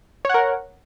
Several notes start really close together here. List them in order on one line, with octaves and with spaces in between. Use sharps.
C#5 F#5 A#4